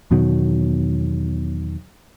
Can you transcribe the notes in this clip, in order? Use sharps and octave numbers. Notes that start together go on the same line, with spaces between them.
E2 B2 D#3 F#3